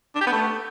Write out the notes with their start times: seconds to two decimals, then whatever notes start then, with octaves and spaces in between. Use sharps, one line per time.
0.15 D4
0.21 G4
0.27 B3
0.32 A3